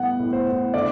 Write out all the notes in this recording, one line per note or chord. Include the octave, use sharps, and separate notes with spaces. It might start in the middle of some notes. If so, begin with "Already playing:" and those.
Already playing: A2 G3 B3 F#5
A2
C5
A2
D3 D5